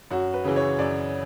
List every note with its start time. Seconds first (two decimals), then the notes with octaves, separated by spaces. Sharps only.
0.11 F#2 F#4
0.34 B4
0.44 C#3 E3
0.56 C#5
0.79 F#2 D5